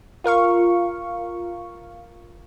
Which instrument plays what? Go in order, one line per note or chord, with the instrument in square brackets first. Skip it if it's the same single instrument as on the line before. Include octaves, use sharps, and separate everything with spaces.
[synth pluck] F4 A#4 F5 C#6